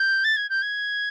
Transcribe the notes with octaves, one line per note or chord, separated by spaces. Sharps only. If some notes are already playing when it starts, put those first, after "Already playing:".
Already playing: G6
A6
G#6
G6
G#6